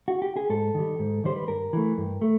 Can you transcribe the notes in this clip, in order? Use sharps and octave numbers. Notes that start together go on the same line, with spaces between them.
F#4
G4
G#4
G#2 A4
D#3 G3
G#2
D#3 G3 C5
B4
G2 A#4
E3 A3
G2
A3